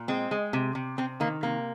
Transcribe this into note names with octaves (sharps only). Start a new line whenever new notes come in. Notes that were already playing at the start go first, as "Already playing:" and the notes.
Already playing: A#2
G#3 C4
G#3
C3
C3
C3 C4
D#3 A#3
C3 A#3